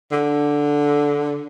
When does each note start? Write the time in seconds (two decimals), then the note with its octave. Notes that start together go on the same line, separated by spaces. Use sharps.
0.12 D3